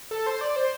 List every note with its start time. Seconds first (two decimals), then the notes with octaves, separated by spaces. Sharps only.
0.11 A4
0.26 C5
0.41 D5
0.56 C5